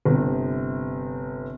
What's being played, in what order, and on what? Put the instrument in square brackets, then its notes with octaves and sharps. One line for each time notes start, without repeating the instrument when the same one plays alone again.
[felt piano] G1 C3